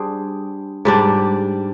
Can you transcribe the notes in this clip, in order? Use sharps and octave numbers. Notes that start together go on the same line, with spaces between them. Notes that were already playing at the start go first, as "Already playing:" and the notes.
Already playing: G3 D4 G#4 C5
G#2 G3 D4